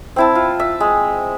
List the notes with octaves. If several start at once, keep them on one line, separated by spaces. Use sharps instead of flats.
C4 E4 A5
F4
E5
G#3